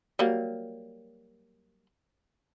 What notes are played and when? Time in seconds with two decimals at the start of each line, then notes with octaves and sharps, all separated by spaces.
0.19 F#3 G3 A#3